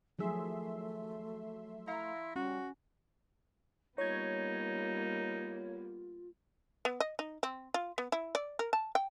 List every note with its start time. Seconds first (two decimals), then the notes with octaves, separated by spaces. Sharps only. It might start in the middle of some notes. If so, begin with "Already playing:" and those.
0.19 D#3 F3 F#3 A3 G#4 E5 C6
1.87 E4 F5 A#5 C6
2.36 G3 C#4 F#4
3.98 G3 A#3 B3 D#4 F4 C#5 G#6
6.85 B3
7.00 D#5
7.19 D#4
7.43 C4
7.74 F4
7.98 B3
8.12 E4
8.35 D5
8.59 A#4
8.73 A5
8.95 G5